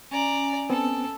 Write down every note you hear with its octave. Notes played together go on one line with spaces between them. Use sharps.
C#4 D5 G#5 A#5
B3 C4 A4